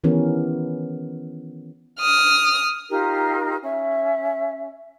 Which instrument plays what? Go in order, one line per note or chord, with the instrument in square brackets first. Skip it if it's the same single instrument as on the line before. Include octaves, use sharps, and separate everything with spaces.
[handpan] D#3 E3 B3 C#4 G4 A#4
[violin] D#6 F6
[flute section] D#4 F4 G4 A#4
C#4 E5